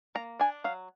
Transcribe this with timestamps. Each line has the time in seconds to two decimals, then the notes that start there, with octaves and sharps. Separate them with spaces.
0.15 A#3 A#5
0.40 D4 G#5
0.64 F#3 F5